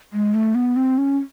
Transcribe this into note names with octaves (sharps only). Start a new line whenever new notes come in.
G#3
A3
B3
C4
C#4